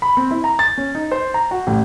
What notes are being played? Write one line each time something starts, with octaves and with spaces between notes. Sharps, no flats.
B5
C4
E4
A#5
A6
C#4
D#4
C5
A#5
F#4
A1